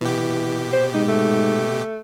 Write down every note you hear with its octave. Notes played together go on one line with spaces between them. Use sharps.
B2 E3 G4
C5
G#2 D#4
A3